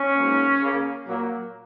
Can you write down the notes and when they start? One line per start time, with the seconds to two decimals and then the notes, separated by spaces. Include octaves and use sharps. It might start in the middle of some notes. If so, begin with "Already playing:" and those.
Already playing: C#4
0.17 G#2 F#3 A#3
0.62 C#3 A#3
1.07 A#2 F#3 A#3